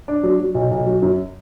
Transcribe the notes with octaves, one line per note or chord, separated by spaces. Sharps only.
D4
F#3
F#3
B1
B1
F#3
F#2